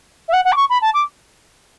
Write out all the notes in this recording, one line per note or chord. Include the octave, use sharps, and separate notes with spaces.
E5
F#5
F#5
D6
C#6
B5
A5
D6